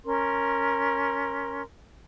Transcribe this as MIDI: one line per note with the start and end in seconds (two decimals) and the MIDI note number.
0.04 1.62 61
0.04 1.62 70
0.04 1.62 84